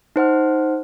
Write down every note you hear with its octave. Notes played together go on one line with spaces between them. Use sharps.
D#4 C5 F#5 F6